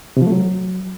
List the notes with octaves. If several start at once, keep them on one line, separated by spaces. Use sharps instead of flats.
C3
F3
A3
F#3